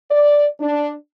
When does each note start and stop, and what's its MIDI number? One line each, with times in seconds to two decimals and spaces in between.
0.10 0.47 74
0.60 0.92 62